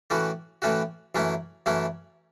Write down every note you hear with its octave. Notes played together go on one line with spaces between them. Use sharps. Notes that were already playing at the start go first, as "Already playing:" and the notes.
A2 E3 A3 C#4 F#4
A2 E3 A3 C#4 F#4
F#2 E3 A3 C#4 E4
F#2 E3 A3 C#4 E4